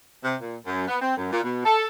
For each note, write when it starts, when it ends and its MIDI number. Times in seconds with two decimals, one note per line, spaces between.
0.24 0.36 48
0.41 0.56 46
0.65 0.87 42
0.88 0.96 59
1.01 1.16 60
1.17 1.27 42
1.32 1.41 46
1.43 1.61 47
1.64 1.88 69